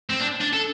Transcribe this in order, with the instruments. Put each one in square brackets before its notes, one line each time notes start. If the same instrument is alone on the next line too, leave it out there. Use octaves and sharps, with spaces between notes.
[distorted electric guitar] C4
D4
D4
A4